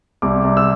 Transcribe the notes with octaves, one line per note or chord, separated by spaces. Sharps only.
C2 D6
C2
E6